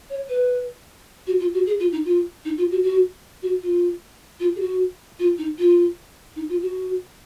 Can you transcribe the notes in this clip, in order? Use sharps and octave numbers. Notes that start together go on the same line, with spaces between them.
C#5
B4
F#4
F4
F#4
G#4
F4
D#4
F4
D#4
F4
F#4
F#4
F#4
F4
F4
G#4
F#4
F4
D#4
F4
D#4
F4
F#4